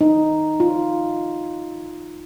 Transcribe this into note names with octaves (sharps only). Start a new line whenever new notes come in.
D#4
F4